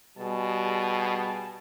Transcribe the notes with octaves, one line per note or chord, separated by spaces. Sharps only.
B2 G3 G#4 A5